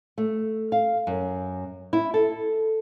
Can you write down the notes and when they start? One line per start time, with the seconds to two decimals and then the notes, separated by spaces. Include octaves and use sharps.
0.18 A3
0.72 F5
1.07 F#2
1.93 E4
2.14 A4